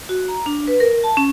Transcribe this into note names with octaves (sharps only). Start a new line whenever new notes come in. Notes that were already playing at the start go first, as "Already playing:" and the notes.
F#4
A#5
D4
B4
A#4
A5
C#4